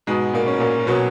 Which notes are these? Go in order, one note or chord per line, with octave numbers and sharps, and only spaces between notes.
G#2 B2 G#3
A#2 A#3
C#4
A#2 A#3
B2 F#3 B3